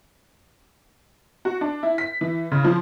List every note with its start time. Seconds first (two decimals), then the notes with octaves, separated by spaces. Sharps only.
1.45 F#4
1.61 D4
1.83 E4
1.98 B6
2.21 E3
2.52 C#3
2.64 F3